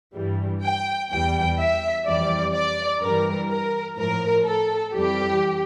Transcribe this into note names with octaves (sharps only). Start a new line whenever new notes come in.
G2 E3 G3
G5
E2 E3 G3 G5
E5
F2 E3 G3 D5
D5
G2 E3 G3 A#4
A#4
A2 F3 A#4
A4
F2 E3 G3 G4